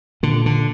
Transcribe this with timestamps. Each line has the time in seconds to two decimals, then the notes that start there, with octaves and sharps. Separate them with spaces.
0.23 A#2 D3
0.46 D3